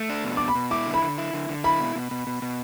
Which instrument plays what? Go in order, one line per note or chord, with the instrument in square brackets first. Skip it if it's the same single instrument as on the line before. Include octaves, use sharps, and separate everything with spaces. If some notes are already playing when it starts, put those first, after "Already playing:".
Already playing: [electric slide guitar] A3
D4
B2
[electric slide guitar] B2 [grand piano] D6
[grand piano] B5
[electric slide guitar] B2
[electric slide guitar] E4 [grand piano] D6
[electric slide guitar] D3
[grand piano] B5
[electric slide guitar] D3
E4
D3
D3
[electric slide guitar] E4 [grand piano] B5
[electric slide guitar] B2
B2
B2
B2
B2